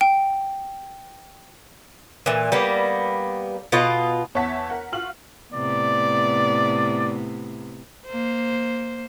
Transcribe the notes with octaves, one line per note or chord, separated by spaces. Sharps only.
G5
A#2 E3
G3 A#3 B3
B2 F4 D#5
E2 C#5 E5 F#5 A5 B6
A#4 F#5
F4 F#4 F6 F#7
A2 C3 B3 D5
A#3 C5